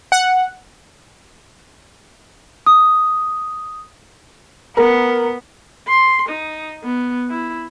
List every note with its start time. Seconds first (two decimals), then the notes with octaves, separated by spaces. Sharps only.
0.12 F#5
2.66 D#6
4.77 B3 A#4
5.88 C6
6.28 D#4
6.83 B3
7.30 E4